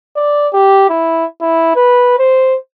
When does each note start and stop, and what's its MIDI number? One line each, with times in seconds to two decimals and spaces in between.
0.16 0.48 74
0.53 0.89 67
0.89 1.25 64
1.41 1.75 64
1.76 2.16 71
2.19 2.57 72